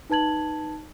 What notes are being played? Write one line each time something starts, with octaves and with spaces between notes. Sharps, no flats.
D#4 B4 A5 G#6 F#7